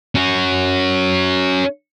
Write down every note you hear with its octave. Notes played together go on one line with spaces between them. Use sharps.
C#4 F#4